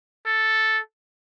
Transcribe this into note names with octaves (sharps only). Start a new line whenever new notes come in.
A4